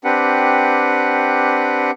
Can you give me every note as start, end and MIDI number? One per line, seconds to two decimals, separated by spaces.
0.04 1.91 60
0.04 1.91 62
0.04 1.91 67
0.04 1.91 71
0.04 1.91 78